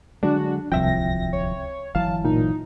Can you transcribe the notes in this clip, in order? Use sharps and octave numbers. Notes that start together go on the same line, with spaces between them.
D3 F#3 G#3 D4 F#4
D1 C2 F3 C4 E5 G5 A#6
C#5
G1 E3 F#3 F5 A5
A#2 D#4